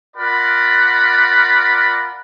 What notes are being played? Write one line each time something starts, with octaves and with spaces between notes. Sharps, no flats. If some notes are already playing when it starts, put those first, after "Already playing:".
F4 A#4 D5 F#5 B5